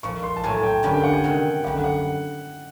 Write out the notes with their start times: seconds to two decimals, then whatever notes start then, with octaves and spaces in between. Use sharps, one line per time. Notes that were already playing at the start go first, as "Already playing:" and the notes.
0.03 A#2 F3 A#3 C#6
0.23 C6
0.36 A5
0.43 A2 F#3 A3 G#5
0.55 G#5
0.63 G5
0.83 G2 D3 G3 A#3 C#4 G#5
0.94 G5
1.04 F#5
1.13 G#5
1.24 C3 D#3 G#3
1.64 F#2 D3 G3 F#5
1.84 F#5